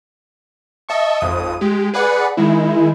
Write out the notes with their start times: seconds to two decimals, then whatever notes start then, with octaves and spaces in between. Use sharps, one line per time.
0.89 D#5 E5 A5 C#6
1.21 G#1 F2 D#6
1.61 G#3 G4
1.94 G#4 B4 D5 F#5
2.37 D#3 G#3 E4